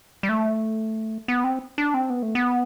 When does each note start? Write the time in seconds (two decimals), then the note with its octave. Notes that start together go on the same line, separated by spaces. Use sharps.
0.23 G3
0.29 A3
1.28 B3
1.44 C4
1.78 D4
1.94 C4
2.10 B3
2.23 A3
2.35 B3